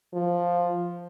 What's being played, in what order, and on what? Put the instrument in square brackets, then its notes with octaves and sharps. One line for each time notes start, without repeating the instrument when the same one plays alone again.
[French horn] F3